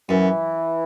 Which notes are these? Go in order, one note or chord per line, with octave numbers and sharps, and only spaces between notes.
F#2 E3